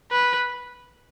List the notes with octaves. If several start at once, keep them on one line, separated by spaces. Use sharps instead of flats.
B4